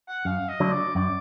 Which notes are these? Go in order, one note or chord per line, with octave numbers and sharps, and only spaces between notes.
F#5
F#2 F5
D#5
D3 F#3 A3 D4
D5
F#2 D5